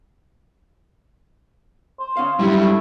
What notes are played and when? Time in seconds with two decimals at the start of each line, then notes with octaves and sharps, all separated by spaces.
2.00 C5
2.17 C#4 F5
2.40 F#2 G3 E4
2.61 A3